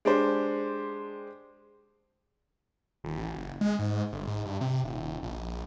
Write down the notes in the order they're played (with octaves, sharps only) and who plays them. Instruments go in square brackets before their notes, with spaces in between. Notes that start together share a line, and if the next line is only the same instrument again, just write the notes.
[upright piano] G#3 D4 G4 C5
[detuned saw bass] D#1
A1
F#1
G#3
G#2
G1
G#2
G2
C3
D#1
A#1